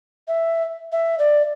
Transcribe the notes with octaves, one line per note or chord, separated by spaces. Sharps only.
E5
E5
D5